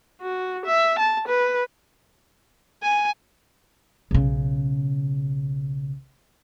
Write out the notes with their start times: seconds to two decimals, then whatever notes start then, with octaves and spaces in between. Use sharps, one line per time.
0.21 F#4
0.66 E5
0.99 A5
1.28 B4
2.82 G#5
4.11 B1 C#3